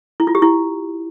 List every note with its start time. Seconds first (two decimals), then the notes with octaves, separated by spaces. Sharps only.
0.20 E4
0.27 F4
0.35 G4
0.42 E4